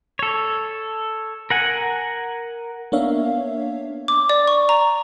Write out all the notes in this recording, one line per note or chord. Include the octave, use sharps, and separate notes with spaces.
A4 C#5
A#4 F#5 G#5
A#3 B3 D4 C#5 E5 F5
D6
D5
C#6
A#5